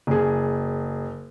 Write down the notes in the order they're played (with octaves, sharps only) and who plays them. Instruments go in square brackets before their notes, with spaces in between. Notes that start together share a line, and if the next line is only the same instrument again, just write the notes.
[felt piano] F#1 G#4